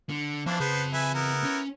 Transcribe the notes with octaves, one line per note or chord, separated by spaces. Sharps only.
D3
E3 F3 C4 D4 F4 A5
C#3 B3 B4 C5
B4 E5 G#5
B3 E4 A#4
C#4